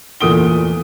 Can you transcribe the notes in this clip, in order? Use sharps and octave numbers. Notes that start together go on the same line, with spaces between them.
E2 A#2 A3 D#6 D7 G7